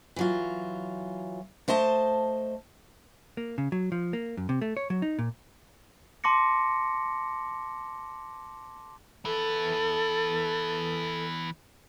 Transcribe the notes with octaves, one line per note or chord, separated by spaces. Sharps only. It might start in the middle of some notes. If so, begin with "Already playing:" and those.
E3 F#3 F4
A3 C5 D#5 A5
A#3
C#3
F#3
F3
A#3
F#2
C3
A3
C#5
F#3
D#4
A#2
A5 C6 D6 A#6 C#7
E3 B3 A4